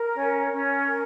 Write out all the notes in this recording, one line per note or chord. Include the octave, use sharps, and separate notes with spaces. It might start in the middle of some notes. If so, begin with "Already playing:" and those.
Already playing: A#4
C#4
C#4
A#4